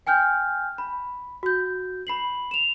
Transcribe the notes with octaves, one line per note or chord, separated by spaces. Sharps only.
G5 G#5 F6 G6
B5
F#4 G6
B5 C7 F#7
E7 F7